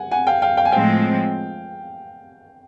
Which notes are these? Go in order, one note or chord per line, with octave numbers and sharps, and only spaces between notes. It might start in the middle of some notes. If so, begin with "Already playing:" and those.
Already playing: F#5 G#5
F#5 G#5
F5 G5
F5 G5
F5 G5
G#5
A2 F3 G#3 C4 F5 G5